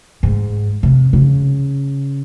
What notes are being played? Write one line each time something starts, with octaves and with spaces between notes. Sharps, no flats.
G#2
C3
C#3